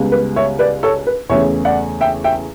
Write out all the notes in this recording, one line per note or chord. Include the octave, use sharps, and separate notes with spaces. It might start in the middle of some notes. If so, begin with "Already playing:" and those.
Already playing: C#2 C#3 G3 B3
B4
C#5 E5
B4 D5
A4 C#5
B4
E2 C#3 E3 A3 C#4 C#5 E5
D5 F#5
E5 G5
E5 G5